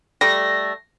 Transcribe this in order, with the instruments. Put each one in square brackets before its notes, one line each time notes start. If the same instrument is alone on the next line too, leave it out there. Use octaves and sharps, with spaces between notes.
[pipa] G3 A3 [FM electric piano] A#6